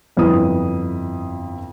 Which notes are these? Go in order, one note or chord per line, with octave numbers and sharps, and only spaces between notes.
G1 F2 E4 B4 D#6